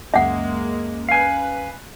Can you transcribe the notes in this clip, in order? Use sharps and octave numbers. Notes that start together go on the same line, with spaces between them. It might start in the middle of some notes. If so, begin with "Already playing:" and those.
C#2 F#2 G#3 A#3 C#4 E5 F#5
B4 F5 G#5